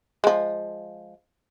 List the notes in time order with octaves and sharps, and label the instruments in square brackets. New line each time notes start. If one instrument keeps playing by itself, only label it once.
[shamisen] F3 G#3